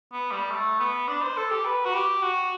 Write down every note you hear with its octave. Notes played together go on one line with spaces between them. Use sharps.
B3
G3
A3
B3
D4
C5
A4
G4
B4
F#4
G4
F#4